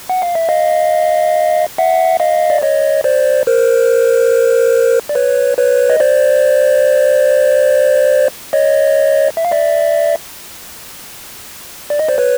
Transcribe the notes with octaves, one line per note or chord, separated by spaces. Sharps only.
F#5
F5
E5
D#5 F5
E5 F#5
D#5 F5
D5
C#5 D#5
C5 D5
A#4 C5
D5
B4 C#5
B4 C#5
D#5
C5 D5
C#5 D#5
E5
F5
D5 E5
D5
D#5
C5 D5
B4 C#5